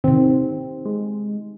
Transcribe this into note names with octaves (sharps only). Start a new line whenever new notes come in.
C3 D#3 C4
G#3